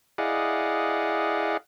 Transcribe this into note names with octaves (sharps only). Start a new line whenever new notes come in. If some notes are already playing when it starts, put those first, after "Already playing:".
E4 G#4 D5 D#5 F5 F#5